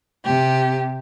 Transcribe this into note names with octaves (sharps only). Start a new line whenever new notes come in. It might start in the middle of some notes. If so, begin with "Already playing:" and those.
C3 G4